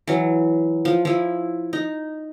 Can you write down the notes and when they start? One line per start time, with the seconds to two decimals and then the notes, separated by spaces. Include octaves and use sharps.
0.07 E3 F#3
0.85 F3
1.05 F3 E4
1.73 D#4